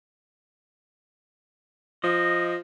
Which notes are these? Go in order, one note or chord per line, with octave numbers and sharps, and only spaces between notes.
F3 D#5